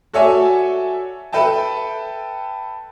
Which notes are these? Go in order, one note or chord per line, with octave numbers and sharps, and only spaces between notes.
F#4 A4 C#5 D5 E5 G#5
A4 B4 E5 G5 A5